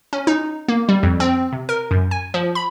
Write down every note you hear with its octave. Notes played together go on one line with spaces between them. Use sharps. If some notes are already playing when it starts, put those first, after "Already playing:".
C#4
D#4
A#3
G3
F2
C4
C3
A#4
F#2
G#5
F3
B5